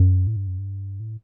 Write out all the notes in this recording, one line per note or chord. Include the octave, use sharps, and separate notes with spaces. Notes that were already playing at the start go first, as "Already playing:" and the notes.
Already playing: F#2
A2
G2
F#2
G2
A2